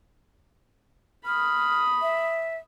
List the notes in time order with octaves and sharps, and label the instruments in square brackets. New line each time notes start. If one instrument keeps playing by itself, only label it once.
[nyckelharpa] B5 D#6 [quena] F6
[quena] E5